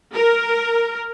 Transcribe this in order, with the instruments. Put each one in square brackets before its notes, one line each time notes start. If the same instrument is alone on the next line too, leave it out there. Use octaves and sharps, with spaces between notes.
[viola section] A#4